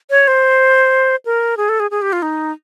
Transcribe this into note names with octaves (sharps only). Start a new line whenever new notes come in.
C#5
C5
A#4
G#4
A4
G#4
G#4
G4
F4
D#4